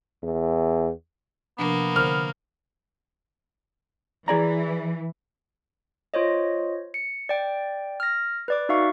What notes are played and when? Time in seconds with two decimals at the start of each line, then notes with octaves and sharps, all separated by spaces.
0.23 E2
1.59 C3 F3 A#3 B3 D4
1.96 D3 A#4 C5 F6
4.28 E3 G#4 D5 A#5
6.14 F4 C5 C#5 D#5
6.94 C#7
7.29 D5 G5
8.00 F6 A#6
8.48 B4 D5 D6
8.69 D#4 F#4 E5 F5 C#6